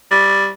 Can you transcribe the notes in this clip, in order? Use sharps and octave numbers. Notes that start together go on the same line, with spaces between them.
G3